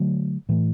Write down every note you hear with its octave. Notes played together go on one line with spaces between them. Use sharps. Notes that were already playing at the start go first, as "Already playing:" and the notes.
Already playing: D3 F#3 A3
A2 E3 A3